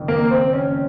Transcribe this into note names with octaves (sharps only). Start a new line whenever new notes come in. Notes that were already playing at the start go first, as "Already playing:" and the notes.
Already playing: F#1 F2 D#3
A#3
C4
C#4